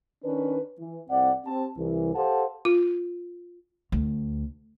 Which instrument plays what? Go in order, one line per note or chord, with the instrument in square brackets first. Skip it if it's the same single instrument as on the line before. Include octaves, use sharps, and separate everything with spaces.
[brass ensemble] D#3 C#4 D4 B4
E3
C2 C4 D5 F#5
C4 G4 A5
C2 E3
G4 A4 C5 F5 F#5 A5
[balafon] F4
[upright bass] D2